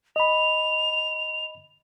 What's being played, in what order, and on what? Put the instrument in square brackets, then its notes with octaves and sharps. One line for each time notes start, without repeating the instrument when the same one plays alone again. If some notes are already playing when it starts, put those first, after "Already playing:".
[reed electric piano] D#5 B5 [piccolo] F7